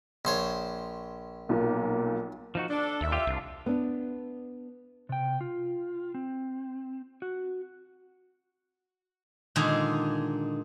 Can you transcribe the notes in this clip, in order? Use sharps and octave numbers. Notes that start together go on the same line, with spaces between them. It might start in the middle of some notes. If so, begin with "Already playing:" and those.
A#1 C5 C#5
B1 A#2 A#3
F3 D#4 F#4
D4 A4
D#2 E5
F4 G4
C2 D4 F4
B3 D4
C3 G5
F4
C4
F#4
A#2 D3 D#3 G#3 G#4